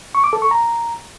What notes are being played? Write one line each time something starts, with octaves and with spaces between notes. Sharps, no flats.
C#6
D6
A4
C#6
A#5